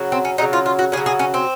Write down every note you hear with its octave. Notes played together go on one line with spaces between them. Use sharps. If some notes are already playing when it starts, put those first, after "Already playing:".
Already playing: C#3 F#3
C4
C#4
C#3 F#3 D#4
F4
F4
F#4
C#3 G#4
F#3
G#4
C#4
C4